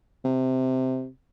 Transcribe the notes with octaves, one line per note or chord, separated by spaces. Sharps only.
C3